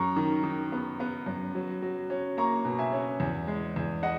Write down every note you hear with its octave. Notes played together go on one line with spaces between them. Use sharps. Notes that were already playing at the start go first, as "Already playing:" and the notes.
Already playing: F#2 A#5 C#6
D#3
D#3
B3
B3
F#2
F#3
F#3
C#4
A#3 A#5 C#6
B2
E5 G#5
C#4
E2
G#3
E2
D#5 F#5